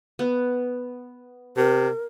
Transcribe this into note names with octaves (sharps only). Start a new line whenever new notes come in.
B3
C3 A#4